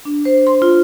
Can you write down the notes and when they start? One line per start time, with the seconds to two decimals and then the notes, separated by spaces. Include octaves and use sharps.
0.05 D4
0.25 C5
0.47 C6
0.62 F4